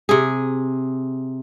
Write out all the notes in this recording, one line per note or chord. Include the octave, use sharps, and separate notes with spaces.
C3 G#4